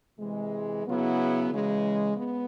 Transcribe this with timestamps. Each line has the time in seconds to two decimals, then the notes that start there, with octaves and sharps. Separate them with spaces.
0.19 C3 E3 G#3
0.85 C#3 F#3 B3 E4 G#4
1.51 C#3 E3 G#3
2.17 B3